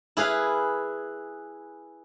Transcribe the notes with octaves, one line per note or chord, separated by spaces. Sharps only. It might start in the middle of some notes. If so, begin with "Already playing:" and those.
E4 G#4 B4 F5